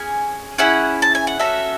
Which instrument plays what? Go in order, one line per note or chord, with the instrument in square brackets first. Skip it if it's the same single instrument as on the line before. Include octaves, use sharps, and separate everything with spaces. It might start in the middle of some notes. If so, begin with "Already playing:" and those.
Already playing: [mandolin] C#4 G#4 G#5
C#4 E4 G#4 F#5
A5
G#5
F#5
C#4 F#4 A4 E5